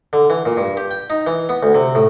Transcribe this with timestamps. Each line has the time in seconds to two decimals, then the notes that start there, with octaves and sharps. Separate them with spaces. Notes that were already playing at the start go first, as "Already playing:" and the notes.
0.13 D3
0.30 E3
0.45 A#2
0.57 G2
0.77 G4
0.91 G5
1.10 D#4
1.27 E3
1.49 B3
1.63 D2
1.75 C3
1.95 A2